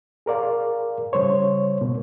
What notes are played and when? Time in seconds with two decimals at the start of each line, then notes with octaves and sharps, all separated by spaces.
0.26 G#4 A#4 D5 F5
1.13 C#3 G3 C5 C#5
1.81 B2 A#3